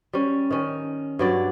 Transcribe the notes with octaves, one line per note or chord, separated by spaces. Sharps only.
G3 C#4
D#3 C#4
G2 F#3 D5